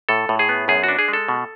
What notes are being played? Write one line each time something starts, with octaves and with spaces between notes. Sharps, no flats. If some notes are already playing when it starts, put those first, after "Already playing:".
A2 A4
A2
G#4
B3
F#2 G#4
D4 F#4
G#4
G#3
A4
B2